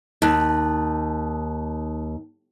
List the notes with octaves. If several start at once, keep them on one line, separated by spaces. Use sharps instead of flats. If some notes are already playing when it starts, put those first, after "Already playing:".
D#2 D#4 A5 F#6